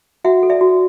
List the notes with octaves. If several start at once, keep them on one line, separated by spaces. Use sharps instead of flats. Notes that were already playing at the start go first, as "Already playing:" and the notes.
F#4 E5 F#5
A4
D5 E5
F#4